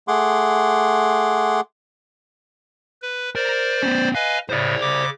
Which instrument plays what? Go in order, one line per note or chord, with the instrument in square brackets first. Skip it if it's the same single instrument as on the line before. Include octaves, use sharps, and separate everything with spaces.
[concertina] A3 G#4 F#5 C6 D6
[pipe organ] B4
[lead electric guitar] A#4 [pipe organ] C5 D5
[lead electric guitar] B3 C#4
[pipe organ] B4 D#5 G#5 [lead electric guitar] F5
[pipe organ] A2 C#3 [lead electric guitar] C5 D5
[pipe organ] C#3 D6